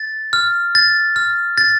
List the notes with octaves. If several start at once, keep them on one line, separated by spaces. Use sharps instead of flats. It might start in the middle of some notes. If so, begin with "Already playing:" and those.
Already playing: A6
F6
A6
F6
A6